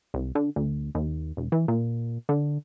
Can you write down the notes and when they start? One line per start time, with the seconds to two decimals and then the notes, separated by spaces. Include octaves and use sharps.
0.14 C2
0.35 D3
0.56 D2
0.95 D#2
1.37 E1
1.52 E3
1.68 A#2
2.29 D3